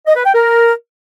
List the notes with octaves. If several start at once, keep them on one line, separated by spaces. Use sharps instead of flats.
D#5
B4
G5
A#4